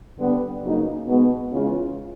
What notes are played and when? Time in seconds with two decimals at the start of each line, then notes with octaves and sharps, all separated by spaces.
0.18 D3 G3 B3
0.63 C#3 F#3 A#3 D#4
1.07 B2 G#3 B3
1.51 C#3 E3 G#3 C#4 F4